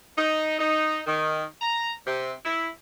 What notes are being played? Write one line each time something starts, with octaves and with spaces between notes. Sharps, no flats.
D#4
D#4
D#3
A#5
C3
E4